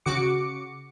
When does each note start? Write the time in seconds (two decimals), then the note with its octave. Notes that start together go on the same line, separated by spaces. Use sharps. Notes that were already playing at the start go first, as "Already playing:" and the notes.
0.06 C#3 F#4 D6 C#7